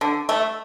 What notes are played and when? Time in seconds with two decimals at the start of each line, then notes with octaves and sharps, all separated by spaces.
0.01 D3
0.29 A3